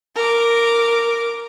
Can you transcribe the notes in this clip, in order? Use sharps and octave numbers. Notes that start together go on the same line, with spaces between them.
A#4 D6